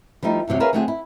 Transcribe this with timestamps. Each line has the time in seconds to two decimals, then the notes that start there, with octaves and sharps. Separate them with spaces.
0.23 F3 G3 A3 D#4
0.48 E2 G2 C3 F#3
0.60 G#4 A#4 B4 C#5 E5 F5
0.73 D3 F#3 A3 C4 F#4 G#4
0.88 E4